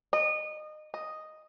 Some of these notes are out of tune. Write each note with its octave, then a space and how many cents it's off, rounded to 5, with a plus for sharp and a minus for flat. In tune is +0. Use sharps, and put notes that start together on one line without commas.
D#5 -25
D#5 +0